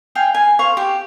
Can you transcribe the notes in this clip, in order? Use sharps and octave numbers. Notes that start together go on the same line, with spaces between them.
F5 G5 G#5
G#5
C5 F5 C#6
G4